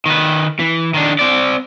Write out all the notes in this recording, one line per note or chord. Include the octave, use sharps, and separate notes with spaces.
D#3 B4
E3
D#3 D4
C4 D5